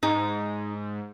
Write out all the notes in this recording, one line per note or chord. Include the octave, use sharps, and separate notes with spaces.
G#2 D#4